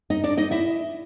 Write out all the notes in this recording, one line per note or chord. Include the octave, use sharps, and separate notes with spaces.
D#4 D#5
D4 D5
D#4 D#5
E4 E5